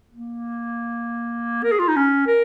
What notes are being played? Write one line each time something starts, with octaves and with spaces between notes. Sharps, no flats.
A#3
A#4
G#4
F4
D#4
C#4
A#4